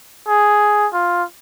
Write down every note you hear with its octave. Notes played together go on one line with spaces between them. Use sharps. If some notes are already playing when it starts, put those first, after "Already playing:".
G#4
F4